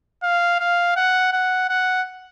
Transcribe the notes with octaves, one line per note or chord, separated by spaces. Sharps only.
F5
F5
F#5
F#5
F#5